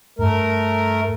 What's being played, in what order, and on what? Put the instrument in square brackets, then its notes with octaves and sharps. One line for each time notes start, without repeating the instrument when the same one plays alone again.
[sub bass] G2 [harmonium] A3 A#4